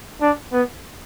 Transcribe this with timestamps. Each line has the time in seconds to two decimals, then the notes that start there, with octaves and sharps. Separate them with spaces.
0.22 D4
0.53 B3